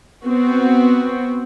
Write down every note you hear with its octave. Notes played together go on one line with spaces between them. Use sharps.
B3 C4 F#4